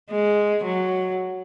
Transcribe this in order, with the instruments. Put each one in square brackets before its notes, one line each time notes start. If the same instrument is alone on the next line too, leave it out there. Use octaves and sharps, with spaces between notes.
[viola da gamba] G#3
F#3